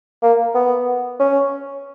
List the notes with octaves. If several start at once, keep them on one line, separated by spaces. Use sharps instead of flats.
A#3
B3
C#4